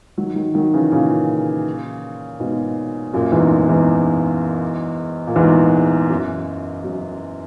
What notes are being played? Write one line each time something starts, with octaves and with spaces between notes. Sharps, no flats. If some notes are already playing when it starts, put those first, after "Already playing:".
D#3 F#3
D#3 F#3
D#3 F#3
C#3 E3
A#2 C#3
G#2 B2
F#2 A#2
E2 G#2
E2 G#2
A#2
E2 G#2
F#2
F#2